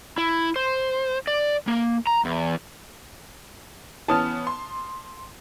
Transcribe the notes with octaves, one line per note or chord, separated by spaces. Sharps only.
E4
C5
D5
A#3
A#5
E2
E3 B3 C#4 A5 D#6 F6
C6